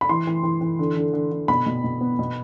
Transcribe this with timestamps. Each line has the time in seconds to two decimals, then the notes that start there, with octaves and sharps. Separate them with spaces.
0.01 B5
0.09 E3 C6
0.27 E3
0.43 E3
0.61 E3
0.79 D3
0.97 D3
1.13 D3
1.32 D3
1.48 B2 B5
1.66 B2
1.84 B2
2.01 B3
2.19 B2